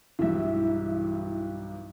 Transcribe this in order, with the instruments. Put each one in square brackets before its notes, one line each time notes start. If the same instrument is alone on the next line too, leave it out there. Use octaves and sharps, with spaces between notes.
[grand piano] B1 G2 [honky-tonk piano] E3 E5